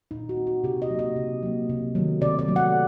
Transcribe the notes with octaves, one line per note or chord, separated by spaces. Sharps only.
A#2 D#4
F#4
G3 C4
F#4
C3 G4
D#5
F#3 A#3
D#5
C3
F#3 A#3
C3
D#3 F#3 A3
C3 D5
D5
D#3 F#3 A3
F#5